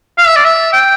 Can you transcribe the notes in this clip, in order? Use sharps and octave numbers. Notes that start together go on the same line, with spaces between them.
F5
E5
D5
E5
G5